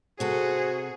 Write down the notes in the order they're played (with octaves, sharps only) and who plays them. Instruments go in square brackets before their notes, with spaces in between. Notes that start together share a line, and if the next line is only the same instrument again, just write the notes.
[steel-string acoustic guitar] C3 A4 [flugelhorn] F#4 [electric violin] G#4 [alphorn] C5